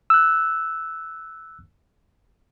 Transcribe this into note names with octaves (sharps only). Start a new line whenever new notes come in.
E6 F#6